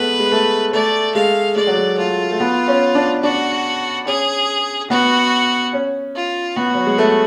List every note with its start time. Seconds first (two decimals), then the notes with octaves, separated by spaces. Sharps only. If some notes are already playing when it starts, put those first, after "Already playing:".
Already playing: G#3 A3 B3 B4
0.19 G#3
0.31 A3
0.73 A3 D5
1.15 G#3 F5
1.56 G#3 D5
1.67 F#3
1.77 G#3
1.98 A3 F4
2.31 A3
2.40 B3
2.68 C#4
2.95 D4
3.23 D4 F#4
4.06 C#4 G#4
4.90 B3 F#4
5.73 C#4
6.15 F4
6.56 B3 F#4
6.75 F#3
6.86 G#3
6.98 A3